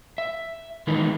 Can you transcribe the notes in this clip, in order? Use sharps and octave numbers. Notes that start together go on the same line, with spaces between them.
E5
D#3 E3 G#3 B3 D#4